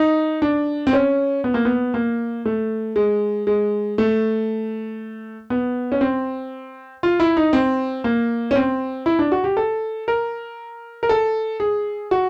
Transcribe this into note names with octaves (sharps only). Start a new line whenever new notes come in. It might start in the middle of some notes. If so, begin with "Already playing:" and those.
Already playing: D#4
D4
C4
C#4
B3
A#3
B3
A#3
A3
G#3
G#3
A3
B3
C#4
C4
F4
E4
D#4
C4
A#3
C#4
C4
E4
D4
F#4
G4
A4
A#4
A#4
A4
G#4
F#4